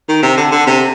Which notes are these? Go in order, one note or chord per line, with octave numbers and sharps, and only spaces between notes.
D#3
C3
D3
D3
C3